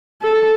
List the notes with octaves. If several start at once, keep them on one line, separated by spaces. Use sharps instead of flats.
A4